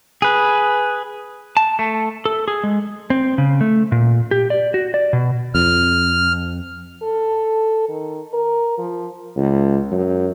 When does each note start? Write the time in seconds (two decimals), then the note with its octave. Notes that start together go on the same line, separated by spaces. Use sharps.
0.22 G#4 B4
1.57 A5
1.79 A3
2.25 A4
2.48 G#4
2.64 G#3
3.10 C4
3.38 C#3
3.61 A3
3.92 A#2
4.31 G4
4.50 D5
4.74 F#4
4.94 D5
5.13 B2
5.55 F2 F6
7.03 A4
7.89 D#3
8.33 A#4
8.78 F3
9.36 C#2
9.91 F#2